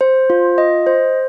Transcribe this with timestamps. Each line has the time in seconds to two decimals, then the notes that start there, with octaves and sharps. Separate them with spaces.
0.01 C5
0.30 F4
0.58 D#5
0.87 C5